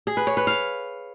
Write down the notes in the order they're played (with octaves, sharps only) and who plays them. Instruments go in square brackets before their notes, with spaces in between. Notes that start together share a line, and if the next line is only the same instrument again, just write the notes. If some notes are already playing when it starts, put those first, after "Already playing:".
[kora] G#4
B4
C#5
B4
F5